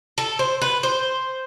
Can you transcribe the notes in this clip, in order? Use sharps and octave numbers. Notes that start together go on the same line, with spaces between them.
A4
C5
B4
C5